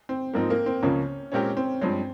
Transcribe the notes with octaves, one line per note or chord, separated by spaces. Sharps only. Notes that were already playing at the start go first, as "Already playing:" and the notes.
C4
G#2 F3 A#3 C4 D#4
A#3
C4
C#2 C#3 F3 A#3 C#4
A#2 G#3 C4 C#4 G4 A#4
C4
G2 F3 G#3 C4 C#4